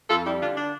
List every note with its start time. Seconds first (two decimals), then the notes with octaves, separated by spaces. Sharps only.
0.10 F2 F4 A4
0.25 G3 E4 G4
0.41 D3 D4 F4
0.57 D4